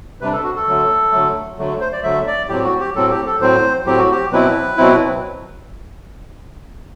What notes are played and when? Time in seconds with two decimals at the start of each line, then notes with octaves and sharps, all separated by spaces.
0.20 C3 G3 D4 B4
0.33 A4
0.43 F#4
0.56 A4
0.67 D3 F#3 A3
1.12 D3 F#3 A3
1.58 D3 F#3 A3
1.80 C5
1.93 D5
2.03 D3 F#3 A3 E5
2.27 D5
2.48 A2 F#3 C4 G4
2.64 F#4
2.80 G4
2.95 A2 F#3 C4 A4
3.11 G4
3.26 A4
3.41 A2 F#3 C4 C5
3.85 A2 F#3 C4 G4
3.98 F#4
4.11 G4
4.31 B2 F#3 C4 E4 B4
4.77 B2 F#3 C4 E4